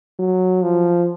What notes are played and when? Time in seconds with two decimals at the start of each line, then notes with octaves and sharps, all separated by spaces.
0.19 F#3
0.63 F3